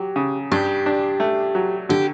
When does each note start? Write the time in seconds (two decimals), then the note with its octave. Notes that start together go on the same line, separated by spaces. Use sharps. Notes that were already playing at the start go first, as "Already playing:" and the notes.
Already playing: F#3 G4
0.16 C#3
0.52 G2 G4
0.86 D4
1.20 A3
1.55 F#3
1.89 D3 G4